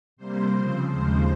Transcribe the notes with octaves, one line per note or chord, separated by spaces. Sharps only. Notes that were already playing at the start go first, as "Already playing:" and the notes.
C3 G3 A#3 C5
C#3 F3 C4
D#2 C#3 F3 G#3 C5